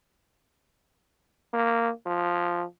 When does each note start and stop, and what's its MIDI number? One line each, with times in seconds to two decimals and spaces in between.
1.53 1.90 58
2.06 2.63 53